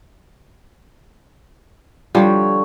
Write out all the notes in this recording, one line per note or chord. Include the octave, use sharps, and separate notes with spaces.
D3 F3 G3 C#5